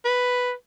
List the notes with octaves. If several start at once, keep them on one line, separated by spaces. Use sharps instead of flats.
B4